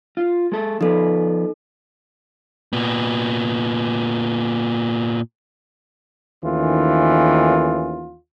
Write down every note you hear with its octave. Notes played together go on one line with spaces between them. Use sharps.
F4
G#3 A4
F3 B3 D#4 A4 B4
A#2 B3
D#2 D#3 E3 A3 C#4 F4